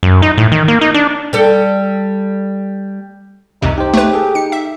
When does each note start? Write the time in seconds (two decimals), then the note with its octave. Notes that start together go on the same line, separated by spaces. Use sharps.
0.03 F#2
0.22 D#4
0.37 A2
0.52 D#3
0.68 A#3
0.81 D#4
0.94 D4
1.33 G3 A4
3.62 C2 F2 C3 D#4
3.78 D#4 G4 C5
3.94 A3 B4
4.13 G#4 A4
4.35 D#4 C#7
4.52 E5